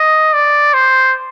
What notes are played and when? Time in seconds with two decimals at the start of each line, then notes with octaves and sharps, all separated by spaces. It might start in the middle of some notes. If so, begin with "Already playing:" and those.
Already playing: D#5
0.33 D5
0.74 C5